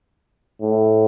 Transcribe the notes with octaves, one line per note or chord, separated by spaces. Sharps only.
A2